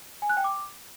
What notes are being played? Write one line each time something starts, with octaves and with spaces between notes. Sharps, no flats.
G#5
F#6
G5
D6